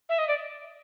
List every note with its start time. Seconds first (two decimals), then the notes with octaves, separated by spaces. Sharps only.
0.09 E5
0.18 D#5
0.28 D5